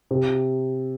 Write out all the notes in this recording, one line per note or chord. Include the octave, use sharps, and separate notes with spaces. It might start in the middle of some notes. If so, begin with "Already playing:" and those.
C3